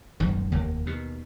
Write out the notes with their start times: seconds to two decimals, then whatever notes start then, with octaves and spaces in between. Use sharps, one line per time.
0.20 D#1 G#1 F#2 D#3
0.52 F1 D#2 A#3
0.86 D#2 B2